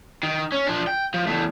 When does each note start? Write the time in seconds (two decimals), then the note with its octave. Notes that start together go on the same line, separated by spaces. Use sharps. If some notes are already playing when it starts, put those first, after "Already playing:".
0.23 D#3
0.52 C#4
0.66 F3 D4
0.87 G5
1.14 F3
1.27 E2 A3